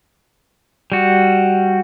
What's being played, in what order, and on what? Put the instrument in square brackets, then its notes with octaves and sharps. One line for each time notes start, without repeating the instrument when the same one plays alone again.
[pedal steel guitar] G3 F#4